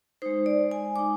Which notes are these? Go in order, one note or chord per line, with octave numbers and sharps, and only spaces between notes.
G#3 D#4 C5
D5
G#5
G#3 D#4 D6